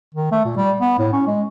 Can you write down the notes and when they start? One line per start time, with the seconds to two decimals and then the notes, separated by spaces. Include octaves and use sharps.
0.15 D#3
0.32 A3
0.45 A#2
0.57 G3
0.81 B3
0.99 A2
1.13 C#4
1.27 G#3